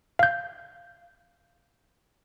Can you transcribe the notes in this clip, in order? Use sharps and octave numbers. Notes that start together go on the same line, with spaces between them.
F5 G6